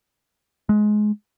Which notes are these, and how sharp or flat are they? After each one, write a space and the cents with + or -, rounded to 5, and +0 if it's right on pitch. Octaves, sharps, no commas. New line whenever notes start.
G#3 +20